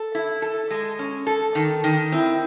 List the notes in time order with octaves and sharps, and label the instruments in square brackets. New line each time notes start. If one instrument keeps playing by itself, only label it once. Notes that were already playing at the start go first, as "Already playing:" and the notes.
Already playing: [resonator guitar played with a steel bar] A4
E4
A4
G#3
C#4
A4
D#3
D#3
[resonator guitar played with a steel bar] C4 [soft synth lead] E4